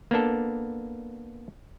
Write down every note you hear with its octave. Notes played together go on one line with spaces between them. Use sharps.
A#3 B3 D4 A4